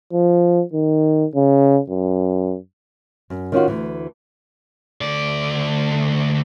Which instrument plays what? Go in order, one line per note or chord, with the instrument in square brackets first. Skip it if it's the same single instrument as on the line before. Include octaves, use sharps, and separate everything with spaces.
[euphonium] F3
D#3
C#3
F#2
[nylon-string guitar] F#2
D#3 C#4 F4 F#4
D2 E3
[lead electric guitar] D2 D5